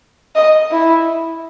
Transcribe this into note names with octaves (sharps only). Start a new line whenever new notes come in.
D#5
E4